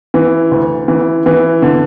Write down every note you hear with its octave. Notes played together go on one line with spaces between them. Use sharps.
E3
D2
E3
E3
D3